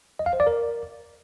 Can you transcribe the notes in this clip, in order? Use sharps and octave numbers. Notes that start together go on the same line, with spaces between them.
D#5
F5
C5
D5
A#4